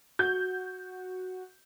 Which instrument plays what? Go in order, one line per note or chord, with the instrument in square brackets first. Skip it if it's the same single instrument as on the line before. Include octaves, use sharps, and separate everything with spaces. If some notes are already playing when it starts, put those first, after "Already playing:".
[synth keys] F#4 [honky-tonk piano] G6